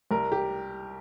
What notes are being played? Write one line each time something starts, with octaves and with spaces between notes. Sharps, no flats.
C2 A#4
G4